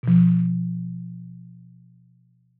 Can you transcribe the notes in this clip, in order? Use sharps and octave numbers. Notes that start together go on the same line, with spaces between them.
B2 F3